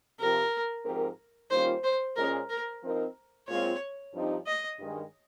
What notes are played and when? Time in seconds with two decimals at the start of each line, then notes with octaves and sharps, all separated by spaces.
0.19 C3 F3 C4 A#4
0.85 G#2 F3 C4 G4 A#4
1.50 D#3 G3 A#3 C#4 F4 C5
1.83 C5
2.16 A#2 G#3 C#4 A#4
2.49 A#4
2.82 F3 C4 D#4 A#4
3.48 A#2 G#3 C4 F4 C#5
4.13 G2 F3 C4 D#4 G4
4.46 D#5
4.79 G2 D#3 G#3